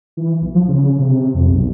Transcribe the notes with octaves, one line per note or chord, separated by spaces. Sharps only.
E3
B1
F3
C#3
C3
F2
B1